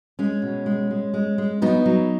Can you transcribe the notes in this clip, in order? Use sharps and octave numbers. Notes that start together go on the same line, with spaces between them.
G#3 C#4
B2
G#3
G#3
G#3
G#3
F#3 B3 D#4
F#3